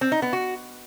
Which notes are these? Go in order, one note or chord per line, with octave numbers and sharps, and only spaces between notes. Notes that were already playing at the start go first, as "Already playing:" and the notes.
C4
D#4
B3
F#4